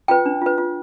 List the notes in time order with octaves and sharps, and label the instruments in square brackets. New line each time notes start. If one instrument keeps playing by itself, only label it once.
[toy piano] F4 B4 G5
D4
F4 B4
F4